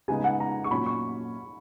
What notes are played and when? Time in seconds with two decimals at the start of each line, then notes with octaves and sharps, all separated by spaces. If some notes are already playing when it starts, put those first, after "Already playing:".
0.08 C#3 G#3 B3 D#4 G#5
0.24 F#5
0.40 A#5
0.64 C#6
0.70 A#2 F#3 C#4 F4 B5
0.86 C#6